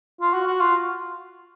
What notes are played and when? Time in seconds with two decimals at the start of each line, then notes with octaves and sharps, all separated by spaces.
0.21 F4
0.34 F#4
0.47 F#4
0.61 F4